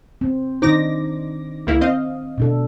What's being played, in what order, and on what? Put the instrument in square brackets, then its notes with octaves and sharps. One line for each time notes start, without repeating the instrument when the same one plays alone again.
[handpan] C4
[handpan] D#3 D4 C5 [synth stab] D#4 D6 A#6
[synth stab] C#2 A#3 E4
C4 D#5 F5
[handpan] B2 D4 A4